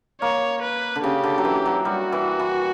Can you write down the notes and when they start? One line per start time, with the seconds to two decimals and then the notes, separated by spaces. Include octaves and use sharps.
0.21 A#3 C#5
0.62 B4
0.96 D3
1.04 C#3 G4
1.24 D3
1.38 F#3
1.45 E3
1.65 F#3
1.85 G3 F#4
2.12 E3
2.40 E3